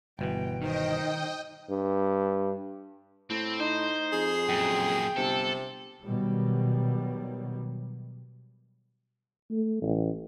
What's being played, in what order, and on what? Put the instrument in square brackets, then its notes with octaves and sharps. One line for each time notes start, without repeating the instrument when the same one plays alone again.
[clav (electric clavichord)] G1 B2 E3 [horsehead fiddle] G5
[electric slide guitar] D#3 [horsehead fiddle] D#4 C5 [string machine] D#5 G5
[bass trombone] G2
[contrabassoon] A2 [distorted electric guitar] C4
[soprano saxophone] D#4 [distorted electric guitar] C5
[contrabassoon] F2 [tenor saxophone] G#4
[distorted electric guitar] F#2 A#2 [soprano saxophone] G5
[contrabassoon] G1 [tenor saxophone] C3 [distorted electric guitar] A4
[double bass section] B2 D#3 F#3 G3
[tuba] A3
A1